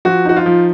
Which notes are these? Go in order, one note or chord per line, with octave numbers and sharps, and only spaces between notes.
F3 F#4
D#4 F#4
F4
F3